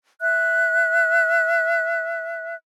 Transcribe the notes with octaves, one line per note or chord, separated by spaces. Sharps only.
E5 F#6